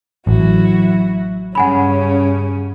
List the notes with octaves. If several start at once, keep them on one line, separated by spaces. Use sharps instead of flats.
A1 F#3 E4 F#4
G2 C#3 C#4 F#5 G#5 B5